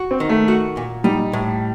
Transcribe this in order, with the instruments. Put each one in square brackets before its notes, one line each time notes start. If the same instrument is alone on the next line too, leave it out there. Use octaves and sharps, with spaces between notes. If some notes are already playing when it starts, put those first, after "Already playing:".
Already playing: [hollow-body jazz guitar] F#4
[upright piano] C4
[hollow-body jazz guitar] D#3
[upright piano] A3
[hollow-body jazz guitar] F#4
A#2
[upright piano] G3 [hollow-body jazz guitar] D#4
[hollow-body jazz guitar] A2